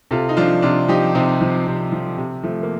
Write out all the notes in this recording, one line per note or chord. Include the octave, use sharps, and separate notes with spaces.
C3 F4 A4
D#4
F3 D4 F4
C3 D4 F4
F3 D#4 G4
C3 C4 D#4
F3
C3
F3
C3
F3 A3
A#3